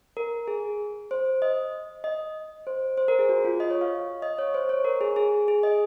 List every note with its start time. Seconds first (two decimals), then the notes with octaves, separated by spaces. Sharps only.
0.17 A#4
0.48 G#4
1.11 C5
1.42 D#5
2.04 D#5
2.67 C5
2.98 C5
3.08 A#4
3.19 G#4
3.29 F#4
3.45 F4
3.60 D#5
3.70 C#5
3.81 F5
4.22 D#5
4.38 C#5
4.54 C5
4.69 C#5
4.85 A#4
5.01 G#4
5.16 G#4
5.48 G#4
5.63 D#5